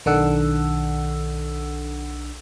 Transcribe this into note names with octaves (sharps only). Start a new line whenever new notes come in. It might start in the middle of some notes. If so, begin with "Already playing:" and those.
B1 D#3 D4 A4 F#5 E6